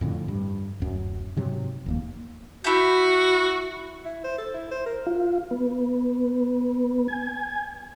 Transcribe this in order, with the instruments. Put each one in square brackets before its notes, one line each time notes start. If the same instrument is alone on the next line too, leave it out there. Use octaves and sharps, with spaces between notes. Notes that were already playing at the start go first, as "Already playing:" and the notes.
[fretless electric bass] F2 A2 D3
G2
D1 F#2
G#2 C3 F#3
F1 D#2 A#3
[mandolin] E4 E5 G6 [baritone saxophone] F#4
[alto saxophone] E4
C5
A4
E4
C5
A#4
[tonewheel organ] F4
B3
G#5